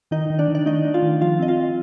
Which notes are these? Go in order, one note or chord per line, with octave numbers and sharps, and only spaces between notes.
D#3 D#4 D#5
D#3
D4 D5
D#3
D5
A3 D#4 D#5
D4
F4 F5
D#3
F3 F4 F5
C4 D#5
F4 F5
C4